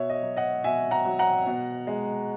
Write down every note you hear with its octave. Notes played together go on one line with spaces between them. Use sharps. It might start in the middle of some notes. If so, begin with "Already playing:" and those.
Already playing: B2 C#5 E5
D#5
F#3
D#5 F#5
B2 E5 G#5
F#5 A#5
F#3
F#5 A#5
B2
G#3